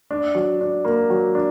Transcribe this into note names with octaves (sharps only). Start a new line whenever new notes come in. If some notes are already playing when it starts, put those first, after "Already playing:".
D4
F#3
D4
A#3
F#3
D4